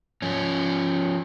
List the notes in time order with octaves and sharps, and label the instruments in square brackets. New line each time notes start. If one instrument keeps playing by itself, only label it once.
[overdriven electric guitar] F3 C#4